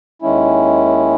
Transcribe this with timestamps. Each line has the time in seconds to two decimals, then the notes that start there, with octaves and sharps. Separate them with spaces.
0.22 D#2 D#3 G#3 C#4 E4